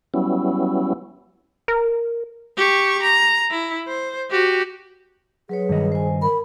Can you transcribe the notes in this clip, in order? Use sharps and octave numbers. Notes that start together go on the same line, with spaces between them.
F#3 G3 B3 C#4 E4
A#4
G4 C#6
A#5
E4
C5
F#4 G4
F#3 G#4 B4 C#5
G2 D#3 D#5
C5 G#5
A#4 B5